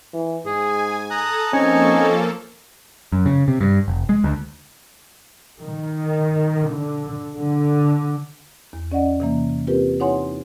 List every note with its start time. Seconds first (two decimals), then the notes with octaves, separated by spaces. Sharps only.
0.14 E3
0.46 G#2 G#4 G#5
1.10 A4 A5 A#5 D#6 F#6
1.53 F3 A#3 C4 C#4 D#4 A4 G#5 C#6
3.12 F#2
3.26 C#3
3.48 C3
3.61 G2
3.88 F1
4.09 G#3
4.24 D2
5.63 D#3
6.70 D3
7.37 D3
8.73 E2
8.92 C#4 D5 D#5 F#5
9.20 C3 E3 A#3
9.67 C4 F4 G4 A#4 B4
10.00 D#4 E4 C#5 F#5 G#5 C6